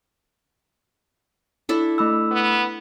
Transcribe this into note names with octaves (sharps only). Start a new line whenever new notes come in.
D4 E4 A4
A3 B5 E6
B3